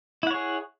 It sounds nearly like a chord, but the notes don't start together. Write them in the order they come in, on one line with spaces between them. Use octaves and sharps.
E4 F#5 C#5 G#4